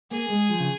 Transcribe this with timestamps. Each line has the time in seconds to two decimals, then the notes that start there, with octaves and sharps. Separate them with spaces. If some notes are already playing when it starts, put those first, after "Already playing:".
0.11 A#3 G#4
0.30 G#3
0.50 F3
0.60 C#3